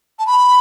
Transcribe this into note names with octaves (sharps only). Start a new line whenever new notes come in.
A5
B5